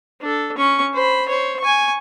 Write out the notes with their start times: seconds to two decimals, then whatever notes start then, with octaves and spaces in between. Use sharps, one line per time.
0.21 D4 A4
0.57 C#4 C#6
0.93 C5 B5
1.29 C5 C#5
1.60 G#5 C#6